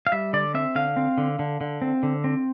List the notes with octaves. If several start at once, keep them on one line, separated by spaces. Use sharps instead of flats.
F5
G3 E5
D3 D5
C4 E5
D3 F5
C4
D3
D3
D3
C4
D3
C4